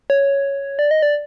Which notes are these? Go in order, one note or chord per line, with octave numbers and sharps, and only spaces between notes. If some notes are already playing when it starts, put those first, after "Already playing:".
C#5
D5
D#5
D5